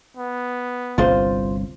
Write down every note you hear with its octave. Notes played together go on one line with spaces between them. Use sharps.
B3
G1 C2 F4 C5